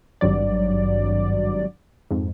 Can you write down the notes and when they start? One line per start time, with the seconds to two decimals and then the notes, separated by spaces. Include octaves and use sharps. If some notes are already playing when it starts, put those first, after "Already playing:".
0.21 G#1 G2 F#3 D5
2.11 F2 G#2